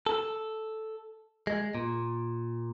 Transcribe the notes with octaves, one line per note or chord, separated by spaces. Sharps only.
A4
G#3
A#2